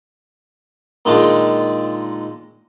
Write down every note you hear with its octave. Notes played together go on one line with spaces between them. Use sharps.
A#2 D3 D#3 G#3 D4 F4